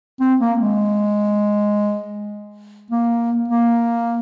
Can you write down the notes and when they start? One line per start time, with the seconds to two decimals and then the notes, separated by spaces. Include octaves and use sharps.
0.21 C4
0.40 A#3
0.59 G#3
2.91 A#3
3.48 A#3